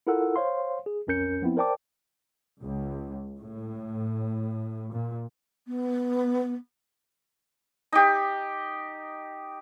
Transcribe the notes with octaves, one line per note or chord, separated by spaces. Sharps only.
E4 F4 A4 A#4 F#5 E6
C5 C#5 F5 C6
G#4
B1 F2 C#4 A#4 G6 C#7
F3 B3 C4 E4
A#4 C5 D5 G5 A5 D6
C#2
A2
A#2
B3
D#4 G4